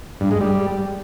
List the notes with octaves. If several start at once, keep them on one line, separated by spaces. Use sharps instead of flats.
G2
G#3
G3